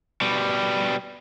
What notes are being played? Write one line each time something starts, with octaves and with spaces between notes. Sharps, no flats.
B2 G3